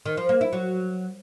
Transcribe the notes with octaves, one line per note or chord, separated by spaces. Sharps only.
D#3
F3
A#3
E4
F#3